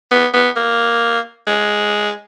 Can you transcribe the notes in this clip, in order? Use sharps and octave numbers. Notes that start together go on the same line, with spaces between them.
B3
B3
A#3
G#3